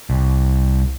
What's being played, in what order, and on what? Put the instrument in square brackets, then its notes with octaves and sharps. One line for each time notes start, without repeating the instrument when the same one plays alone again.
[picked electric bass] C2